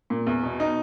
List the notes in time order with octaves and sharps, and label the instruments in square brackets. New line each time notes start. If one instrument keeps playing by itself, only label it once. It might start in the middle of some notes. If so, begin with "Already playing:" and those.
[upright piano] A#2
E2
B2
D#4